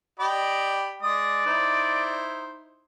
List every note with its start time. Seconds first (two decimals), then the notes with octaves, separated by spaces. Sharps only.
0.20 G4 D5 D#5 B5
1.02 G#3 D5 D#6
1.46 D#4 E4 C5